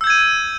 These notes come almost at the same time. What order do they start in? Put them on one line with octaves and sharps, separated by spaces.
E6 G6 G#6 D#7